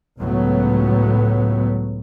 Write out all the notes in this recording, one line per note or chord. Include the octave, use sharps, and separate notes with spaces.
C#2 A2 F#3 B3